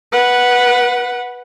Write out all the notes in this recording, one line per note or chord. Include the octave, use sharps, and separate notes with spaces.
B4 F#5